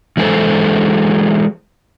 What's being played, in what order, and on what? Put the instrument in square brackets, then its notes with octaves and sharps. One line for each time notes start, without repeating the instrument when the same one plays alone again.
[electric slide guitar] E3 G#3 E4 G#4 A4 C5